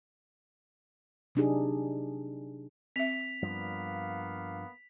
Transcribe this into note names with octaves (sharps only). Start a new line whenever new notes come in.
C3 F#3 D4 D#4 G4 G#4
C4 E5 B6 F7
G2 F3 A#3 B3 F5